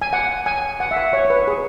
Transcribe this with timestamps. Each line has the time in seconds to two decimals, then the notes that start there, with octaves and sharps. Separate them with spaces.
0.02 G#5
0.13 F#5
0.46 G#5
0.80 F#5
0.91 E5
0.97 F#5
1.13 C#5
1.25 C#5
1.30 B4
1.47 G#4